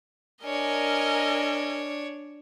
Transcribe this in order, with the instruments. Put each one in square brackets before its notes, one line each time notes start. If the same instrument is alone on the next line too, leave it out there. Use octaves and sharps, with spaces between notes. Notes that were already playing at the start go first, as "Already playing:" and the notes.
[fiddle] D4 C#5 [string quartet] A#4 D#5 G#5